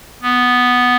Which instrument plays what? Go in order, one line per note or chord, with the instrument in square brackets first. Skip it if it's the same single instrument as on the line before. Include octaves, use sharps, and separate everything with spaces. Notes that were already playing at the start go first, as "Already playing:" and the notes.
[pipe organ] B3